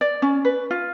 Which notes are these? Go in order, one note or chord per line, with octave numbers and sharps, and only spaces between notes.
D5
C#4
B4
F4